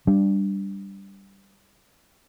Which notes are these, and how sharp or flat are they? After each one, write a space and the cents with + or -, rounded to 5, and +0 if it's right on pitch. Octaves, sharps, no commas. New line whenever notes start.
G3 +0 D4 +0